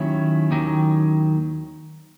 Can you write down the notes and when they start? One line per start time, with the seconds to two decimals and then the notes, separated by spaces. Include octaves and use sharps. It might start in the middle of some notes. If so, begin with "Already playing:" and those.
Already playing: D#2 D#3 F#3 C#4 E4
0.51 D#2 D#3 F#3